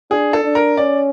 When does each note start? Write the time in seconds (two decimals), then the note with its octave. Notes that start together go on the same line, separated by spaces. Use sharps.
0.11 D4 G#4
0.33 A4
0.44 D4
0.55 A#4
0.77 C#4 D5